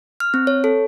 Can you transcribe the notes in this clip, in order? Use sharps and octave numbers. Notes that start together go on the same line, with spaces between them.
F6
C4
C#5
A4